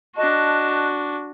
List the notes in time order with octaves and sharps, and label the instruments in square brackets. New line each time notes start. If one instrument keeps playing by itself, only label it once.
[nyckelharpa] D4 F#4 [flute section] D#5 A5 F#6